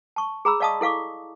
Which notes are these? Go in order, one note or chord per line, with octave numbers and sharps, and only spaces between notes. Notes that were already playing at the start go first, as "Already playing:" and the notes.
A5 C#6
G#4 A#5 B5 E6
D5 D#5 F5 A5 C#6 D#6
E4 A4 F5 C#6 D6